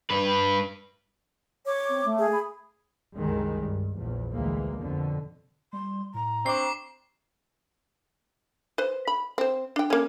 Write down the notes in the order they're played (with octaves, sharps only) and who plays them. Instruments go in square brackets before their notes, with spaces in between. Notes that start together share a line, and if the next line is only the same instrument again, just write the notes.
[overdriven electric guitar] G2 B4
[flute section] C#5 D6
[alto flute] C4
A3
[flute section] G#4
[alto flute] B5
[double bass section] C2 F#2 D#3 G3 G#3
G2
A#1 E2
D2 E3 G#3 A#3
F2 B2 D3
[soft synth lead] G3 [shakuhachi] C6
[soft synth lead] A2 [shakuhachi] A#5
[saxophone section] C4 D4 [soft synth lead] C#6 [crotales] D6 C7
[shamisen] B4 C5
B5
C4 C5
D4 G5
A#3 C#4